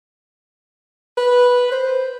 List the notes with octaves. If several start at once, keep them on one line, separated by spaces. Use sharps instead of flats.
B4
C5